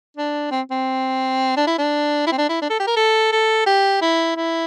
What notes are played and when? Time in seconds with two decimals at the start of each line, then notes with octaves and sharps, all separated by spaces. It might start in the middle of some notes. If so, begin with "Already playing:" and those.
0.17 D4
0.51 C4
0.71 C4
1.57 D4
1.67 E4
1.78 D4
2.26 E4
2.32 C4
2.38 D4
2.49 E4
2.62 D4
2.70 A4
2.80 G4
2.87 A#4
2.96 A4
3.32 A4
3.66 G4
4.01 E4
4.36 E4